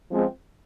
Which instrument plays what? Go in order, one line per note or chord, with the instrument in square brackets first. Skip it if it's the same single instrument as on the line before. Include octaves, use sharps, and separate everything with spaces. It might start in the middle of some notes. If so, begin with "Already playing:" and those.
[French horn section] F3 G#3 C4